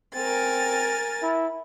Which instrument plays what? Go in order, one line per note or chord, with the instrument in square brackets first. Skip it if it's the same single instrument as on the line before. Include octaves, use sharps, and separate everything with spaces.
[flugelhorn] C4 [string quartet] A#4 G#5 A6
[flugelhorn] E4